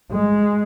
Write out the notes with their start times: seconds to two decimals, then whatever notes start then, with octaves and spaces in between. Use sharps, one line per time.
0.11 G#3